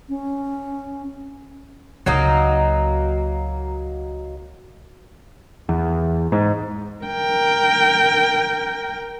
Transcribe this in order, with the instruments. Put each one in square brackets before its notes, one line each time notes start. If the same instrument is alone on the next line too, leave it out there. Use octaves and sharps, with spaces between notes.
[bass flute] C#4
[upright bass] C#2 [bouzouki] F#3 A#3 D#4
[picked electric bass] E2
G#2
[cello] A#4 G5